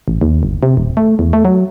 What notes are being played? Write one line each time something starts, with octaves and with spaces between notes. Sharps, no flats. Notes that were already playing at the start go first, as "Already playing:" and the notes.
A1
D#2
G1
C3
D#1
A3
E2
A3
F#3